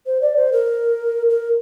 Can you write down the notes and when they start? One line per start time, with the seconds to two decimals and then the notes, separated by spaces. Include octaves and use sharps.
0.06 C5
0.22 D5
0.36 C5
0.52 A#4
1.30 A#4